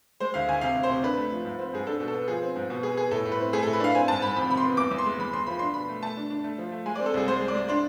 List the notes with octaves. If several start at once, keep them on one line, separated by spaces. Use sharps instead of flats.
G#3 C5
D2 F5
D2 G#5
C3 F5
D2
C5
C3
D4 B4
A3
F3
G#2
C4
G#2 G#4
D4 A4
B2
A4
B3
F3 G#4
C4
G#2
B2
B3 G#4
B3 G#4
A2 A4
A2
B4
C4
A3 G#4
A2 A4
B4
D4 F5
C4 G#5
G#2 A5
G#2 B5
F2 B5
C3 B5
C6
B3
E2 D6
E2
C6
G#3
E2 B5
E2 C6
F3 B5
D4 C6
B2 B5
A3
A3 A5
D4
D4
A3
F3
A3
G#3 G#5
C4 D5
A4
C2 G#4
G#3 C5
G#3
D5
G#3
D4 C6